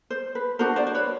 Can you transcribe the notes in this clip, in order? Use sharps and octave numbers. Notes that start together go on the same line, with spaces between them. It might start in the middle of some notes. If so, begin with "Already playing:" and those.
C5
B4
D4 F#4 A#4 C5
C5 D5
C5
B4 C#5